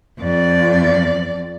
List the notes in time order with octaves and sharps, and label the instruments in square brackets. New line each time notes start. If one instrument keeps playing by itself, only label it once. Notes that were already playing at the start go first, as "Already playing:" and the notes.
[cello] F2 D5